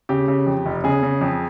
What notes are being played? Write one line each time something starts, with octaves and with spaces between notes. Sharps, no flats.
C#3 G4
C#3
F2
F1
C#3 G#4
C#3
F2